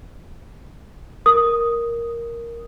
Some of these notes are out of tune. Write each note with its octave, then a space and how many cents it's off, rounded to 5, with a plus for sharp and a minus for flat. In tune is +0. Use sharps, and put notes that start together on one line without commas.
A#4 +0 D#6 +0